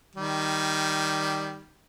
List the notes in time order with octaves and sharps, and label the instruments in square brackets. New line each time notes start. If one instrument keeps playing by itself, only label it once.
[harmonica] D#3 G3